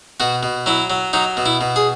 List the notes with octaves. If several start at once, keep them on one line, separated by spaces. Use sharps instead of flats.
B2 F#4
B2
F#3 E4
F#3
F#3 D#4
B2
E4
B2
G#4